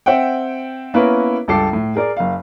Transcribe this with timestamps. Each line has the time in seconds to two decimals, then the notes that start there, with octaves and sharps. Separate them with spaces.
0.06 C4 E5 F#5 G5
0.94 A#3 B3 C#4 E4 A#4 B4
1.48 C#2 G2 A4 D6 C7
1.73 A2
1.95 G#4 A#4 D5
2.17 F#1 F5